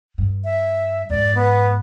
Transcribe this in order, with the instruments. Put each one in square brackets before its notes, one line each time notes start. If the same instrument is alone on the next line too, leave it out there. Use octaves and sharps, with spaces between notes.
[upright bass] G2
[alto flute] E5
[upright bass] F2 G#2 [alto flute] D5
[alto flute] B3